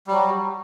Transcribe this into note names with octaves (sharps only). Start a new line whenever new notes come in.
F#3 G3 F#4